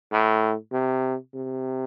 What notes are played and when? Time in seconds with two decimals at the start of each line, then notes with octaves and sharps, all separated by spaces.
0.12 A2
0.72 C3
1.35 C3